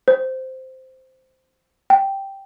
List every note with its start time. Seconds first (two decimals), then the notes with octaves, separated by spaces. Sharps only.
0.08 C5
1.90 G5